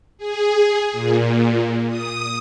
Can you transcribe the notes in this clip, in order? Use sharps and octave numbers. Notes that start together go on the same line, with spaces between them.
G#4
A#2
D#6